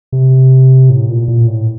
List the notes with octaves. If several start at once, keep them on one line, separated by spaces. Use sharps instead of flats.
C3
A2
A#2
A#2
A2